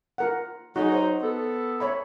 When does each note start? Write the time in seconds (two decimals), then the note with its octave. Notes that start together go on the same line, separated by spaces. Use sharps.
0.18 F4 A#4 F#5
0.76 F#3 D#4 F#4 G#4
0.92 C5
1.22 B3 A4
1.80 C#5 E5 B5